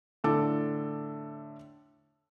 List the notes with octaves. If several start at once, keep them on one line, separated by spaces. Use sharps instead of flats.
A2 D3 A4 D6